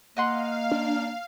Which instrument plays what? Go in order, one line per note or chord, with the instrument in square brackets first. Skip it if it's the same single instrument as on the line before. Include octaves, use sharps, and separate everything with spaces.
[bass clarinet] A#3 [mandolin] D#5 F#5 C6 [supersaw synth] F5
[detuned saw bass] D4